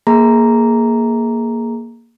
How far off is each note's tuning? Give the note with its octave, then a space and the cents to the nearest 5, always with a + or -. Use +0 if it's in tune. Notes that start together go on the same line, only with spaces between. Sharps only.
A#3 +0 G#4 +10 A#5 -5